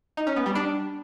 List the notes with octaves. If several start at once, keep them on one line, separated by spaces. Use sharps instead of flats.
D#4
C#4
B3
G3
D4